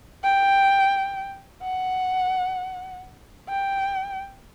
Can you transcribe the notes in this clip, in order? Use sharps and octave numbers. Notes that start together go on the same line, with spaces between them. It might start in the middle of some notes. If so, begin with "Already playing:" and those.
G5
F#5
G5